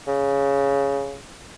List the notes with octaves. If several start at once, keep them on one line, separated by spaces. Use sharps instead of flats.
C#3